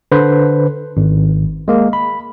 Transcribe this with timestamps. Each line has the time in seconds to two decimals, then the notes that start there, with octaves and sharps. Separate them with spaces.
0.12 D3 B4 C5
0.97 G#1
1.68 G#3 A#3
1.93 B5